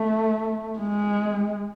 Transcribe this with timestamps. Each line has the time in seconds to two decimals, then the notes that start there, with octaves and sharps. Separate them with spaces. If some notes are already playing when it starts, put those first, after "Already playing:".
Already playing: A3
0.80 G#3